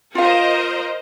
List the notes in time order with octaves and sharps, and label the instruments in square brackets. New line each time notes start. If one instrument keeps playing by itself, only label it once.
[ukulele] F4 F5 [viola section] A#4 C5 D#5